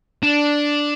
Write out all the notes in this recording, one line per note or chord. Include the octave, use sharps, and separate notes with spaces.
D4